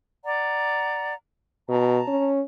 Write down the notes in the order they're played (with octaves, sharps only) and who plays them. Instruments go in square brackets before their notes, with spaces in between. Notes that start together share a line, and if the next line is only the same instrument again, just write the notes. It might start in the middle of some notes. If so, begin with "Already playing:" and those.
[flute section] D5 F#5 A#5
[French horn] B2 [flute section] A5 A#5
[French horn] C#4